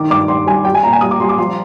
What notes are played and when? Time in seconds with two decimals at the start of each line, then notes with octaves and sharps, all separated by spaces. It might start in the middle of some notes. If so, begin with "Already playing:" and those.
Already playing: D#3 D6
0.10 G2 D6
0.28 G2 C6
0.47 G3 G#5
0.65 G3 G5
0.75 G#5
0.83 A#2 A#5
0.93 G#5
1.01 G3 D#6
1.11 D6
1.20 G3 C6
1.29 D6
1.38 F3 C6